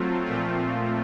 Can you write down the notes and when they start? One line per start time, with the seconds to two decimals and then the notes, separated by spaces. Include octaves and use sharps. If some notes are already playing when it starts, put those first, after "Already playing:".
Already playing: F#3 A3 C4 F4
0.26 A#2 F3 A3 C4 F4